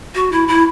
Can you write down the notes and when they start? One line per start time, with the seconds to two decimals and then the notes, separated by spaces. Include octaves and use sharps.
0.15 F#4
0.32 E4
0.48 E4